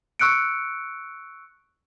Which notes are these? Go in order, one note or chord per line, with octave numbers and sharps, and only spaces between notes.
C#6 E6 F#6 C#7 D7